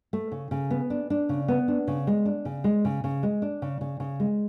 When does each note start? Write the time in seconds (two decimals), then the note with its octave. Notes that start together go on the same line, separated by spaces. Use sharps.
0.13 A3
0.32 C#3
0.51 C#3
0.70 B3
0.90 D4
1.10 D4
1.29 C#3
1.48 B3
1.68 D4
1.87 C#3
2.07 G#3
2.25 D4
2.45 C#3
2.64 G#3
2.85 C#3
3.04 C#3
3.23 G#3
3.42 D4
3.62 C#3
3.81 C#3
4.00 C#3
4.20 G#3